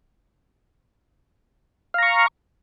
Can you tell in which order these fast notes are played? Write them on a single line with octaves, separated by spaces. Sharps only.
F5 A#5 C#6